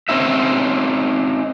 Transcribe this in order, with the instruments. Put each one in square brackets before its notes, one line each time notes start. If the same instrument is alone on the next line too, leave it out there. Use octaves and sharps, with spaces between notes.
[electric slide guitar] C4 C#4 D#4 E5